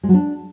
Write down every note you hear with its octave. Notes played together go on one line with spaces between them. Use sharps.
G#3
F#3
D4